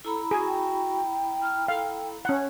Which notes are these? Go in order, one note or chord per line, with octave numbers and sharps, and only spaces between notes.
E4 A4 A#5 B5
F#4 G#4
G5
F6
A4 F5
C#4 F#5